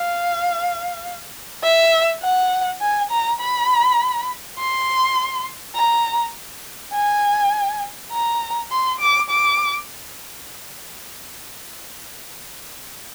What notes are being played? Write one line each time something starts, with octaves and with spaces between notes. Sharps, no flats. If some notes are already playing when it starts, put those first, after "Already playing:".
Already playing: F5
E5
F#5
G#5
A#5
B5
C6
A#5
G#5
A#5
C6
D6
D6